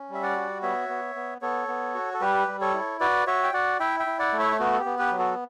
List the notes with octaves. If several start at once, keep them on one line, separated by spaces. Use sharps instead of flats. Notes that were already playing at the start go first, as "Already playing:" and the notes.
Already playing: C#4
G3 E5
D5 F#5
F#4
B3 C#5 E5
B3
B3
B3 A4 C#5
B3
F#4
A4
G3 G4 B4
G3
A4 C#5
E4
F#4 B4 D5
F#4 C#5 E5
G5
F#4 D5 F#5
E4 E5 G5
E5 G5
E4
D5 F#5
A3
C#5 E5
B3 F#4
A4
G4
B3
G4 B4
F#3
F#4 A4